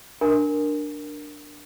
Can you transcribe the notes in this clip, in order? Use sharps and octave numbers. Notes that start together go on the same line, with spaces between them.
D4 A#4 G#5